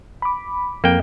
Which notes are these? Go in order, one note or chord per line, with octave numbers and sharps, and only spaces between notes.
B5 D6
F2 A#3 G5